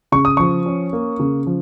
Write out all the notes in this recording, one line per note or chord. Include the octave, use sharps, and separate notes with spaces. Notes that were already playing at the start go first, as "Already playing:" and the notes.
C#3 C#6
D#6
F3 C#6
C#4
A#3
C#3
F3